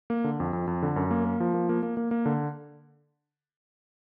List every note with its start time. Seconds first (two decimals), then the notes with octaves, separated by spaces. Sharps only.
0.10 A#3
0.24 D3
0.40 F2
0.53 F2
0.67 F2
0.82 D3
0.96 F#2
1.11 A#3
1.25 A#3
1.40 F3
1.54 A#3
1.69 A#3
1.83 A#3
1.97 A#3
2.11 A#3
2.26 D3